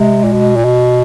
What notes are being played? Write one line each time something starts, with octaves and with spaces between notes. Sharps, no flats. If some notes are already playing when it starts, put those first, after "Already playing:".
Already playing: C3 G#3
A#2
B2
A#2
B2